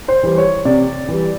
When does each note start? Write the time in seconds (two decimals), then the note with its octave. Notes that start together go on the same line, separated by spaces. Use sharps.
0.08 C5
0.23 E3 G3
0.38 C#5
0.65 C3 D5
1.08 E3 G3